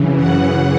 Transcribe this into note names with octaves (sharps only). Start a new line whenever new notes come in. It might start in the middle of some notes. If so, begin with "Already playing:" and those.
Already playing: F#2 C#3 E3
F#5